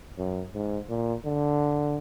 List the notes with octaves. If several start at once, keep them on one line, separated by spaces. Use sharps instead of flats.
F#2
G#2
A#2
D3